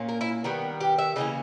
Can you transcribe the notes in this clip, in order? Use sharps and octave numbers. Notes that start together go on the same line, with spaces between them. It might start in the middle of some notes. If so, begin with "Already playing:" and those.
Already playing: A#2 A#3 C#4
A#4
E4
D#3 G3 B3
G4
E5
C#3 E3 A#3 C#4 D#5